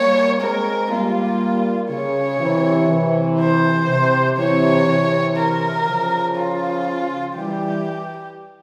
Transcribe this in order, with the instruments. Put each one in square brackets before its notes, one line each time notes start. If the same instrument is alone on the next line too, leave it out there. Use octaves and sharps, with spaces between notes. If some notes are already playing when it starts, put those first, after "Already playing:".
Already playing: [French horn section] G3 A#3 [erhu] C#5
[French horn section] G#3 C4 [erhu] A#4
[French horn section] G3 A#3 [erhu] F4
[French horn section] C#3 [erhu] C#5
[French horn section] C3 E3
C3 E3
[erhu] C5
[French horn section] C3
[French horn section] C3 E3 [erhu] C#5
[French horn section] C3 E3
[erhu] A#4
[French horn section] C#3 F3
[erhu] F4
[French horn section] E3 G3 [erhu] G4